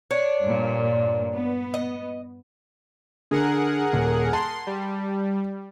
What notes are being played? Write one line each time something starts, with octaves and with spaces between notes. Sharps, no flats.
D4 C#5
G2 A#2
B3
D#5
D3 G#4 A#4 F#5
D#1
A5 C6
G3